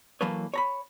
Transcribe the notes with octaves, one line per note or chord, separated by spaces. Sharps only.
E3 F#3 A#3 A4 B4 C#5
C#5 A#5 B5